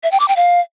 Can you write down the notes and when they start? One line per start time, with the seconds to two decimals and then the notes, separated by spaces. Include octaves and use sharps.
0.03 E5
0.12 G5
0.20 D6
0.28 G5
0.36 F5